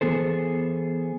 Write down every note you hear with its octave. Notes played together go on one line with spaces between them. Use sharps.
E3 B3 G#4 A4 C5